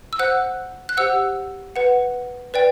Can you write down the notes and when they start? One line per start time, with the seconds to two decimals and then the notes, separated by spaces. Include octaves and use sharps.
0.13 E6
0.19 C5 F#5 F#6
0.89 F#6
0.97 G4 C5 F#5 E6
1.76 B4 F#5
2.54 B4 D5 G5